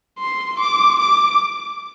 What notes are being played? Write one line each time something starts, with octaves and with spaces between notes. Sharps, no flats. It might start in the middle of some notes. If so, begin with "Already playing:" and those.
C6
D6
D6